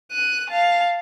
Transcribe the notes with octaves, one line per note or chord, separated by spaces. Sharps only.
F#6 D#7
F5 A5